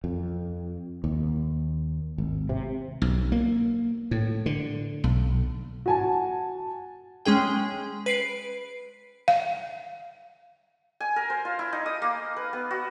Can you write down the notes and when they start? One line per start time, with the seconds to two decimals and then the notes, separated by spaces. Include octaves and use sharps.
0.04 F2
1.04 D#2
2.18 G#1
2.49 C3
3.02 B1
3.32 A#3
4.11 A2
4.46 D3
5.04 B1
5.86 F#4 G#5 A5
7.26 G#3 C#4 G#4 G5
8.06 B4 C7 D7
9.28 F5
11.00 G#5
11.16 A#4
11.30 C5
11.45 F4
11.59 E4
11.73 D#4
11.86 D#6
12.02 A#3
12.36 B4
12.53 B3
12.71 F#4